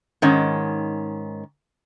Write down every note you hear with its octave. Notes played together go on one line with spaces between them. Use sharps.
G#2 D#3 C#4